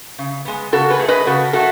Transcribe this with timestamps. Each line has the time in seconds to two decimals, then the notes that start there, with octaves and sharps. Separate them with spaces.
0.18 C#3
0.45 G#3 B3
0.72 C#3 F#4 A4
0.90 G#4 B4
0.99 F#3 A3
1.08 B4 D#5
1.27 C#3 F#4 A4
1.53 F#3 A3 F#4 A4